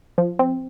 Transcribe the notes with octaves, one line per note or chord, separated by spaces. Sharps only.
F3
C4